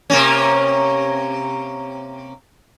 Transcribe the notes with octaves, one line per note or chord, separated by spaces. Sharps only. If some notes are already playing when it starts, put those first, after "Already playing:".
C3 A#3 C#4